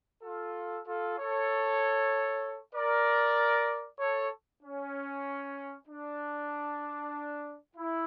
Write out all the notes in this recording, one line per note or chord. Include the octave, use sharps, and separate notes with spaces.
F4 A4
F4 A4
A4 C#5
A#4 D5
A4 C#5
C#4
D4
E4